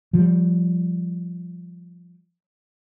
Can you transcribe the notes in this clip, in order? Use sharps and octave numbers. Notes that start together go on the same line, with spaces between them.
F3 G3